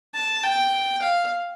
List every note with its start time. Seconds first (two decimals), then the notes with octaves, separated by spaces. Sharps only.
0.15 A5
0.43 G5
1.02 F5